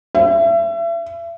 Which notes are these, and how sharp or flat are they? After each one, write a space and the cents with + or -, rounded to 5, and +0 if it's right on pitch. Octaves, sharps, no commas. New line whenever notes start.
E5 +35